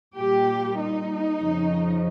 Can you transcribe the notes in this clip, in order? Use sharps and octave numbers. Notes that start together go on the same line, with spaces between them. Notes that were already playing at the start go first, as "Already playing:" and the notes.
A#2 G3 G4
D#4
F2 C#3 F3